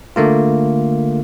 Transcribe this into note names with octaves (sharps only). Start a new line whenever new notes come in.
D3 A3 A#3 F4